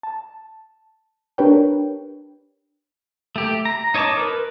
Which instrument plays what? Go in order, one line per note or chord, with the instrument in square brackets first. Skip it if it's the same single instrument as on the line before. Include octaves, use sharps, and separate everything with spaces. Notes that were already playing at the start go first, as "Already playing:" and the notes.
[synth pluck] A5
D4 G4 A#4 B4 C#5 G5
[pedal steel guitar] A3 G4
A#5
D#4 C#5 D#5 A5 D6
A#4 B4